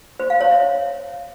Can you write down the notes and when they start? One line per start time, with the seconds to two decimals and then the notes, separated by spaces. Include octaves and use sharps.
0.20 C5
0.30 F5
0.41 C#5
0.51 E5